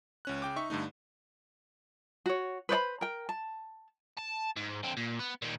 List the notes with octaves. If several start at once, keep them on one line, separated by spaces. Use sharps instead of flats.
C#2 C#4 F#6
C#3 G5 D6
D#4 E5 C#6
G2 D3 A3 D#4
F#4 C#5
B4 C5 D5 B5
A#4 G5
A5
A5
G#2
D3 C4
A#2
B3
A#2 D#3